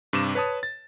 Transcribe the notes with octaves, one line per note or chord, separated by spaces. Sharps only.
G2 C3 D6 E7
B4 C#5 A5 D#6
A6